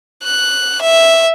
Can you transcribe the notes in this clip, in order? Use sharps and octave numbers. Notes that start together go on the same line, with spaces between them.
F#6
E5